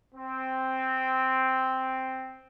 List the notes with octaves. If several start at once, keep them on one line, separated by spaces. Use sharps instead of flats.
C4